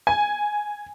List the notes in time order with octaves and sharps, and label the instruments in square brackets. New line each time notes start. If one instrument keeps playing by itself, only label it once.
[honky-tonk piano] G#5